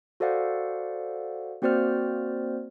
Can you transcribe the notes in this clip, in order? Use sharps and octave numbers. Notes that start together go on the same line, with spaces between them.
F#4 A4 C5 D5 F5 F#5
A#3 C4 F#4 C5 D5 F6